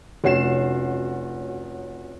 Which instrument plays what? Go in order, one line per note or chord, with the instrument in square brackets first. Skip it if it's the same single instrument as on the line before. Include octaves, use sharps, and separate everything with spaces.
[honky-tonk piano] F1 C#4 F#4 C7 E7